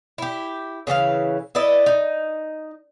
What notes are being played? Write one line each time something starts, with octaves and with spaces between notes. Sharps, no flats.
E4 G4
C#3 E3 F#4 F5
E4 B4 D5 D#5
D#4